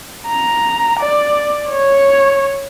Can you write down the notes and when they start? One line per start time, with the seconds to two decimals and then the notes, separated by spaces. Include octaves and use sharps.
0.28 A#5
1.00 D5
1.70 C#5